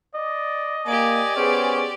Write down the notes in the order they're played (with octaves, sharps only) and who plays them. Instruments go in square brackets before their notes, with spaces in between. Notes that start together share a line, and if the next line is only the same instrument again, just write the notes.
[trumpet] D5 [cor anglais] D#5
[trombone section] A#3 [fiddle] G4 D5 [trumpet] G#5
[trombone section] B3 G#4 [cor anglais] C#4 [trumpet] C5